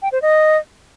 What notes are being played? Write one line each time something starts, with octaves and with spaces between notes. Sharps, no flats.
G5
C5
D#5